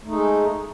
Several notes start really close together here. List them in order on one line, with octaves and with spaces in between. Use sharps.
A3 D#4 G#3